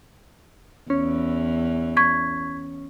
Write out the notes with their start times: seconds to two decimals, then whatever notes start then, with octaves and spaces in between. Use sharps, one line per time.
0.90 E2 E3 C#4
1.97 C#6 G#6 B6